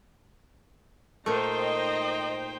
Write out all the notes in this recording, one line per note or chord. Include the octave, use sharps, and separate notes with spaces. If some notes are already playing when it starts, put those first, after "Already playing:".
A#2 A3 D#4 C5 G5
D#5